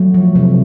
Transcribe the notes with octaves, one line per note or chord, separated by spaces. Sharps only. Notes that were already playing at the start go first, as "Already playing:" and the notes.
Already playing: F#3 A3 F#4
F3
C3